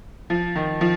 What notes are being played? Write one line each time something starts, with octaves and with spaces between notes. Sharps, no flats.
F3
D#3
F3